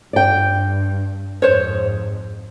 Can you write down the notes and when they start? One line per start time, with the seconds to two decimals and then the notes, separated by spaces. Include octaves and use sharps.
0.13 G2 D5 G5
1.42 F2 G#2 C5 C#5